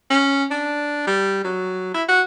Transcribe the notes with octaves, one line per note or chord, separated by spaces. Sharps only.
C#4
D4
G3
F#3
E4
F#4